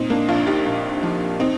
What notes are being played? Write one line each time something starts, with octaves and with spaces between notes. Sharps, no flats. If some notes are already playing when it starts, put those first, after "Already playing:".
Already playing: A#2 C4 D#4
A#3 D4
A#1 D4 F4
D#4 G4
A#1
F3
C4 D#4